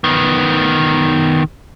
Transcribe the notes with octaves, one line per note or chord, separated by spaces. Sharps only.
D#3 B3